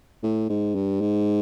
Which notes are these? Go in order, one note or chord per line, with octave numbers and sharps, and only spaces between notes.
A2
G#2
G2
G#2